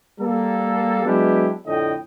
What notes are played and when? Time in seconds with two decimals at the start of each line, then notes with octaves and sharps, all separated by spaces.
0.20 G3 A#3 A4
1.05 F#3 G#3 B3 D4 E4 G4
1.67 F2 A2 D3 D#5 G5